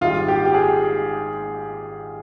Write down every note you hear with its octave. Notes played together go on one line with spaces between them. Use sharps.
G#1 G#2 G3 F4
G4
G4
G#4